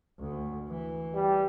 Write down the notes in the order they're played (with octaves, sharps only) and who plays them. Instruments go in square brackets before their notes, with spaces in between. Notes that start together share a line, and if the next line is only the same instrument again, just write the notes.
[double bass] D2
E3
[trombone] G3